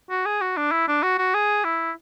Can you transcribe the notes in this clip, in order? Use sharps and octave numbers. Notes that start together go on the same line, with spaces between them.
F#4
G#4
F#4
D4
E4
D4
F#4
F#4
G#4
E4